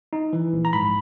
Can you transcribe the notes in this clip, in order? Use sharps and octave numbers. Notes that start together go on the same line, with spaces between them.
D#4
E3
A#1
A#5
G#2 B5